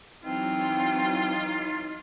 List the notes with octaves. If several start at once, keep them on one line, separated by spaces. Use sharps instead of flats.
E3 F#3 C4 D#4 F4